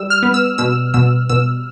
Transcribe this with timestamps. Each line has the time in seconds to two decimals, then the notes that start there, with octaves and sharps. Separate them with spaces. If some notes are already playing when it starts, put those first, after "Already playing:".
Already playing: G3 E6
0.10 F6
0.23 B3
0.34 E6
0.58 B2 E6
0.94 B2 E6
1.29 B2 E6